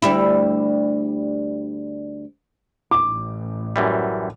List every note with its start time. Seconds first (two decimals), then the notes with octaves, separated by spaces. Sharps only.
0.02 D2 G3 E4
2.91 A1 D6
3.76 F#2 E3 G3